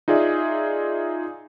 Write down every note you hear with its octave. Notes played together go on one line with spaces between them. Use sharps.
D#4 F4 G#4 D5 E5